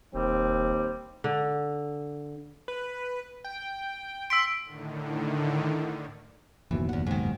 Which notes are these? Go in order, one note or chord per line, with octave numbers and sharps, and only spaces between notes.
E1 D#2 G3 C4
D3
B4
G5
C6 E6 B6 D7
A2 D3 D#3
F#1 D#2 B2 E3
E2 F#5
G#2 D#3